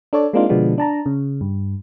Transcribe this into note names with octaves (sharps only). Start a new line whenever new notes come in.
D4 A4 C#5 D5
G#3 A#3 C4 D4 D#4 F4
B2 D3 F3 G#3 B3 D4
D4 A5 A#5
C#3
G2